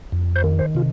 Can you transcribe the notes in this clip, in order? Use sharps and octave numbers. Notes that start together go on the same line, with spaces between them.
F2
C5
D#3
C5
C3 F4